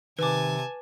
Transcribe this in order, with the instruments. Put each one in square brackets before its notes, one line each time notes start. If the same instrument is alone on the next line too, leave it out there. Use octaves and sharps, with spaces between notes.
[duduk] C3 [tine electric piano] D#3 [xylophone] B4 D6 [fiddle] G#5 A5